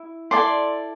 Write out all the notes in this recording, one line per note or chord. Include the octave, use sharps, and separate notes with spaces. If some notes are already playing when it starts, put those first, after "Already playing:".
Already playing: E4
E4 A4 D5 C6